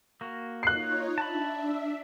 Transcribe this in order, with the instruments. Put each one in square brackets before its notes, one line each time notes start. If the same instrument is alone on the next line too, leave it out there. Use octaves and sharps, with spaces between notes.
[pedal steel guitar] A#3 F#4
[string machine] D#4 F4 C#5 [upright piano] F#6 C7
[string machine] D4 E5 [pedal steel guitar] A5 B5